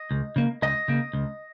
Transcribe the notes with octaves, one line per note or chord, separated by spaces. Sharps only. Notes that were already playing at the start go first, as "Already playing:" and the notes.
Already playing: D#5
C#2
C#3 A#3
C#2 D#5
C#3 A#3
C#2